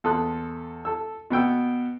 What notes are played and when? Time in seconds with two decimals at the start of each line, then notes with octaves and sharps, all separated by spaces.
0.04 E2 A4 C6 D#6 F#6
0.85 A4 E6
1.30 B2 B3 G5 E6